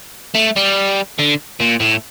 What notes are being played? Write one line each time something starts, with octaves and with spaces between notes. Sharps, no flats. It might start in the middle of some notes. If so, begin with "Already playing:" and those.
A3
G3
D3
A#2
A2